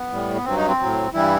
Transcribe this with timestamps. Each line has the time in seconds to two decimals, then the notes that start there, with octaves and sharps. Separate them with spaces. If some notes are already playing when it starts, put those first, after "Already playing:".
Already playing: B3
0.10 A2 G3
0.36 B3
0.45 G2 F#3 C4
0.56 D#4
0.68 C4
0.80 A2 F#3
1.14 G2 E3 G3 E4